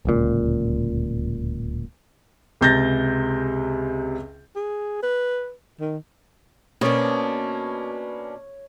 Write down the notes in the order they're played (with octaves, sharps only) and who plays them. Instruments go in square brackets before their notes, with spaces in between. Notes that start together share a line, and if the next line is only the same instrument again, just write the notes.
[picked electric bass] D1 C#2 A#2
[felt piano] C#2 C3 G6 A6 A#6
[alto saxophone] G#4
B4
D#3
[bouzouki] B2 D4 [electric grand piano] A#3 C#4 [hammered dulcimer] C#5